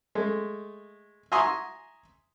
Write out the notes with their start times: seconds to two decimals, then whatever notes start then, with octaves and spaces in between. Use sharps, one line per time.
0.15 G#3 A3
1.32 E5 G#5 A#5 C6 C#6 D#6